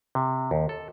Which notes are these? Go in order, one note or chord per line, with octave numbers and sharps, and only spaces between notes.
C3
D#2
A4